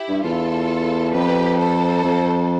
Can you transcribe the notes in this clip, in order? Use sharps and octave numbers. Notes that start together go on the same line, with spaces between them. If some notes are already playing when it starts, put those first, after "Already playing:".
Already playing: E4 G4
G2
E2 F4 A4
F2 G4 B4
A4 C5
F2